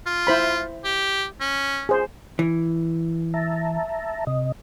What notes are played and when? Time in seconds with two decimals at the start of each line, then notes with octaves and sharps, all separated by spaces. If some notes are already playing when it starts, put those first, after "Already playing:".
0.06 F4
0.27 E4 C5 B5
0.84 G4
1.41 C#4
1.89 G#4 C5
2.39 E3
3.34 E5 A5 A#5
4.27 C3 D#5